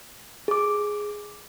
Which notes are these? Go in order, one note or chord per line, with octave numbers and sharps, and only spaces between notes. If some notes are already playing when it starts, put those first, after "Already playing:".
G#4 D6